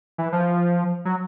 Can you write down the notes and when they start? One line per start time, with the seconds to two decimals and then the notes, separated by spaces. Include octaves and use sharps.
0.18 E3
0.33 F3
1.05 F#3